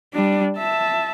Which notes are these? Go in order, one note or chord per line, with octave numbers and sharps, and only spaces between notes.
G3 D4
E5 A5